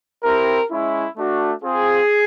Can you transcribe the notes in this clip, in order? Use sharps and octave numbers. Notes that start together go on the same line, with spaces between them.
C4 E4 G4 A#4
G#3 C#4 E4
A3 D4 F#4
C4 F4 G#4